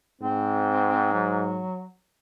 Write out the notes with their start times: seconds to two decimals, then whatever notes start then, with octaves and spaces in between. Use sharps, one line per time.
0.21 G#2 C4
1.14 F#3